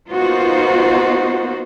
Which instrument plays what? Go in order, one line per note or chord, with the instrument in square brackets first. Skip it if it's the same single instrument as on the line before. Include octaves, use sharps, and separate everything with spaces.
[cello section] A#3 B3 D#4 F4 F#4 C5